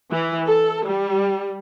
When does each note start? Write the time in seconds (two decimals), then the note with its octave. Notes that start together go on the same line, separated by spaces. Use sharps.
0.11 E3
0.47 A4
0.84 G3